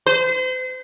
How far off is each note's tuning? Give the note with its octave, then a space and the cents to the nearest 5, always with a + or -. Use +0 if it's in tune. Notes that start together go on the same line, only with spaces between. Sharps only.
C5 -35